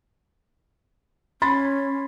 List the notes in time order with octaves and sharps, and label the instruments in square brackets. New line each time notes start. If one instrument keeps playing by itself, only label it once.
[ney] C#4 [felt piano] B5 C6 A6